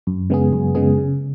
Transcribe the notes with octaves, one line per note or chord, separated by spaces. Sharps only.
F#2
C#3 G#3 B3 G#4
F#2
C#3 G#3 B3 G#4
C#3